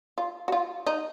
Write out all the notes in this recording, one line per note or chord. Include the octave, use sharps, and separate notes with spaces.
F4
F#4
F4
D#4